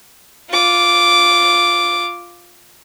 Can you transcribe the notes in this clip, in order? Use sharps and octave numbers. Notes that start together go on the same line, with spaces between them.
F4 D6